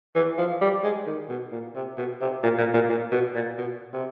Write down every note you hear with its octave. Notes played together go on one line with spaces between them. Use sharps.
E3
F3
G3
G#3
D#3
B2
A#2
C3
B2
C3
A#2
A#2
A#2
A#2
B2
A#2
B2
C3